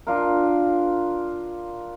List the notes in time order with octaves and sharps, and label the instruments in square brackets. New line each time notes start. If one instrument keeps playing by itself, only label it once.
[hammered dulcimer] D4 F4 A#4